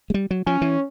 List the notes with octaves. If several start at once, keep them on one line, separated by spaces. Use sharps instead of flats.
G#3
G3
F#3
F3 C#4
E3